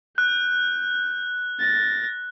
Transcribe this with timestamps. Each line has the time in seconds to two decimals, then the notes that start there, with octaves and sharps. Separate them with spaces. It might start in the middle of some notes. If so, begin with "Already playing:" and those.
0.18 F#6 G6
1.60 A6 A#6